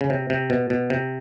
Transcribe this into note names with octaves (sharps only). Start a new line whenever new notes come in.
C#3
C3
C3
B2
B2
C3